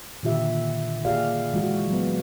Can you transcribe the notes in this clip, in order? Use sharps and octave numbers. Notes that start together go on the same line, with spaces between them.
A#2 D3 D#3 F4 G4 E5
A#3 F4 G4 G#4 D5 F5
E3 G#3 F#4
F#3 B3